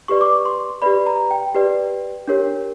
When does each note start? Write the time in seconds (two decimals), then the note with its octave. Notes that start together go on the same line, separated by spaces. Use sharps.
0.08 G4 B4 D5 C#6
0.21 D6
0.33 C#6
0.45 C6
0.82 G4 B4 D5 B5
1.06 A#5
1.31 G5
1.55 G4 B4 D5
2.28 D4 G4 A#4 C#5